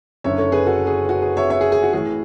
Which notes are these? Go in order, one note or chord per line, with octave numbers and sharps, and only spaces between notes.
F#1 F#2 D3 C#5 E5
A4 C#5
G#4 B4
F#4 A4
G#4
F#4
G#4
C#5 E5
C#5 E5
G#4
G#4
F#4
A1 A2 E3 G#4